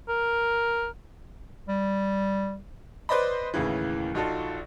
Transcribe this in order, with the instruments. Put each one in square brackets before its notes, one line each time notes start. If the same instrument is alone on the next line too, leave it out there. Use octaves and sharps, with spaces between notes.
[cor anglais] A#4
[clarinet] G3
[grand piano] B4 C5 D5 D#5 B5
D#2 A2 C#3 E3
A#1 D#4 F4 F#4 A4